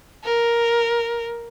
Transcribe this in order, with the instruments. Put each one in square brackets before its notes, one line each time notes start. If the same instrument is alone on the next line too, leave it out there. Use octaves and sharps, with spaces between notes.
[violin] A#4